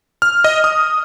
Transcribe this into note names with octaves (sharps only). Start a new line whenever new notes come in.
F6
D#5
D#6